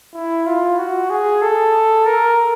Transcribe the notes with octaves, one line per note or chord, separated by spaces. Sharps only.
E4
F4
F#4
G#4
A4
A#4